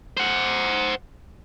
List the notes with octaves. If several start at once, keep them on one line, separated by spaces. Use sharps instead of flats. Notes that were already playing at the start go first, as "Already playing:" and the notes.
C5 F#5